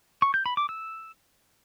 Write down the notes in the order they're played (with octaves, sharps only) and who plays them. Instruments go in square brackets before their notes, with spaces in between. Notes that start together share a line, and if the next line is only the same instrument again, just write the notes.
[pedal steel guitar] C#6
G6
B5
D6
E6